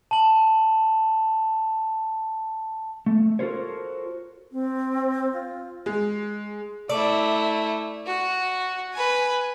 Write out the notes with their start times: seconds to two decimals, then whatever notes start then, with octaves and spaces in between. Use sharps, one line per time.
0.11 A5 F#7
3.06 A3
3.39 F4 F#4 A4 A#4 C5 C#5
4.52 C4
5.33 F4
5.86 G#3
6.89 A3 E4 D5
8.06 F#4
8.94 B4 G#5